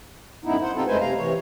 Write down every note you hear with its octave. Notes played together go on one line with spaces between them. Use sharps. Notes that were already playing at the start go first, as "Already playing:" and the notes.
F#2 A2 C#3 B3 D#4 E4
C5 F#5
C3 C4 D#4 F4 A4
F#2 G#3 A3 B4 C5 G#5
C3 F5 A#5
C3 E3 C#5